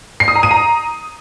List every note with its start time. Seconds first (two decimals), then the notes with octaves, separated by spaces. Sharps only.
0.20 C7
0.28 D#6
0.35 A#5
0.43 D#7
0.51 A#5